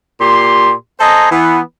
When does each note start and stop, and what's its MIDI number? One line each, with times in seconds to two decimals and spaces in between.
0.21 0.73 46
0.21 0.73 67
0.21 0.73 84
1.01 1.29 69
1.01 1.29 72
1.01 1.29 75
1.01 1.29 80
1.01 1.29 82
1.31 1.60 52
1.31 1.60 59